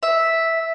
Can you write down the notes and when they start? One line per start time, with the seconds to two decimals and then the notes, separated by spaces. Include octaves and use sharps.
0.03 E5